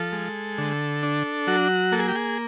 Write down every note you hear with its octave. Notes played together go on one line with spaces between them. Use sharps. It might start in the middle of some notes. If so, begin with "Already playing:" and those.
Already playing: F3 A4
G#3
D3
D4
F#3 F#4
A#3 A4
G#4
G4
G#4